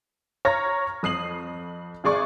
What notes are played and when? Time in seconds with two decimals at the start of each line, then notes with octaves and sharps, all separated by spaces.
0.45 C#5 A#5 C#6 F6 A#6
1.03 F2 D#6 C7 F#7
2.04 G#1 G#4 D5 C#6